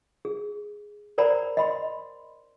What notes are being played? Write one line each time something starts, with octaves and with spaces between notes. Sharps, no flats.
G#4
A#4 C5 D5 A#5 B5
D#5 B5 C6